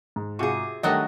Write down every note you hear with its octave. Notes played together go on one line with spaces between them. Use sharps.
G#2
C3 F4 F#4 G#4 C#6
D#3 F#3 G3 A3 D4 F#4 D#5